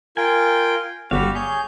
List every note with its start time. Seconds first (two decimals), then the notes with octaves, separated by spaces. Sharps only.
0.17 F4 A#4 G5 G#5
1.11 G1 G3 F#4 G4 F5
1.35 G#4 C#5 G6